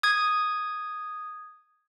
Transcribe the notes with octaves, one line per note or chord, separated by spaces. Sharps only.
D#6 G#6